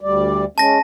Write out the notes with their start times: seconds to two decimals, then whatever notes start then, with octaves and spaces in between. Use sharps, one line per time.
0.01 D2 G3 D5
0.58 G#3 C#4 A5 A#6